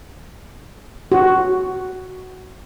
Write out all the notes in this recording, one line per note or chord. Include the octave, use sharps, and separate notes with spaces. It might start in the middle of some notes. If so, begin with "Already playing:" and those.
F#4